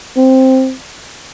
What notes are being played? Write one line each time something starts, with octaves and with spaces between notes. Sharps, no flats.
C4